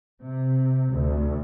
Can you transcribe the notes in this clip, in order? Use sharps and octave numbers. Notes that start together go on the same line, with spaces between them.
C3
D2